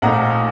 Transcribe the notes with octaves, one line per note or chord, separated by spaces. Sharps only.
A#1 A#2 A3 D#4 F#5 A#5